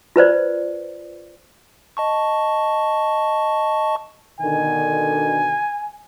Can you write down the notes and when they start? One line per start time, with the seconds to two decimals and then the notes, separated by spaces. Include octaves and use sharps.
0.16 F4 B4 C5 D5
1.97 D#5 A5 C#6
4.41 B2 D3 D#3 G#5